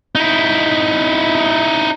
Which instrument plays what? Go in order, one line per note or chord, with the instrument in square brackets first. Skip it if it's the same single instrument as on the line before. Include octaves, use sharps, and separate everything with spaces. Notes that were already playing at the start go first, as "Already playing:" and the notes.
[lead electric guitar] D#4 E4